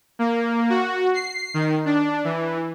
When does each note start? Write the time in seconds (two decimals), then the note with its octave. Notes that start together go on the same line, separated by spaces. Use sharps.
0.19 A#3
0.70 F#4
1.14 C7
1.54 D#3
1.86 D4
2.24 E3